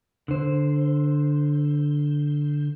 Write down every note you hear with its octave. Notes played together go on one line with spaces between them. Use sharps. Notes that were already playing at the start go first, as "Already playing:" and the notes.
D3 C5